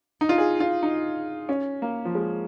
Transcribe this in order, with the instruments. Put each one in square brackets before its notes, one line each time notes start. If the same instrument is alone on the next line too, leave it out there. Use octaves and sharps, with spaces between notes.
[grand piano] D#4
F4
G#4
F4
D#4
C#4
A#3
F3
G#3